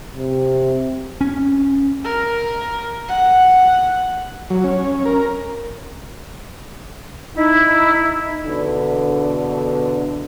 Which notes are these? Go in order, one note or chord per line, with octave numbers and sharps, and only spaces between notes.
C3
C#4
A#4
F#5
F#3
C#4
A#4
D#4 E4
E2 B2 D3